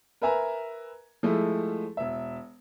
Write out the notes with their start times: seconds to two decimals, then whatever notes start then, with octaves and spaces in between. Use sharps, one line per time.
0.22 A#4 B4 E5 G#5 A#5
1.23 F3 G#3 A3 E4
1.97 E1 E5